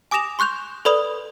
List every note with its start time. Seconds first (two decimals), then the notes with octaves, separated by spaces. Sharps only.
0.11 G#5 D6 D#6 A#6 E7 F7
0.39 C6 C#6 F#6 G6 F7
0.85 A4 B4 D5 B5 D#6 F7